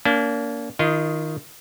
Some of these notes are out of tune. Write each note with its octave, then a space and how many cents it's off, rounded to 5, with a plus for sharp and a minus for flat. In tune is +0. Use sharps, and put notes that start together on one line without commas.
A#3 +0 D4 -40
D#3 +0 F4 -35 D#5 +0